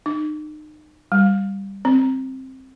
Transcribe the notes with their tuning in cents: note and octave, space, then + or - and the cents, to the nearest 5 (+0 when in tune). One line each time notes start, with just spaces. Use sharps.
D#4 -35
G3 +5
C4 +10